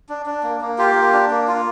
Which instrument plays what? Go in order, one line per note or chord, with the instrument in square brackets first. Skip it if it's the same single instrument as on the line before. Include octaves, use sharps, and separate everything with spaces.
[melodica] D4
D4
A#3
A#3
F4 G4
A#3
D4
A#3
F4